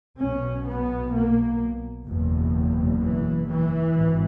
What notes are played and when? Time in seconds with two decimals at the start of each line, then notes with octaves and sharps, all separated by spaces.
0.19 B1 B2 C#4
0.66 B3
1.14 A#3
2.07 F#1 E2 B2
3.01 E3
3.48 E3
3.95 G#1 G#2